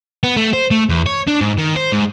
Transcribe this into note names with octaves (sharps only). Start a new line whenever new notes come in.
B3
A3
C5
A3
E2
C#5
D4
G#2
D#3
C5
G#2